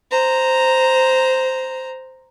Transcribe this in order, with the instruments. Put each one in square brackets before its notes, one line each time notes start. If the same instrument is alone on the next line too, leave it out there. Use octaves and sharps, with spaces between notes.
[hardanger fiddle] C5 A#5